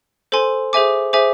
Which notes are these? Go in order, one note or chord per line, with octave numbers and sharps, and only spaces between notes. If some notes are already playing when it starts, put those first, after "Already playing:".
A4 C5 G#5 C6
G#4 C5 E5 G#5 D6
G#4 C5 E5 G#5 D6